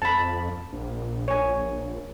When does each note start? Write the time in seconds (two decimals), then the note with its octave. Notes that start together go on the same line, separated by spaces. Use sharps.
0.02 F2 A5 B5
0.72 A#1
1.28 C#5 G#5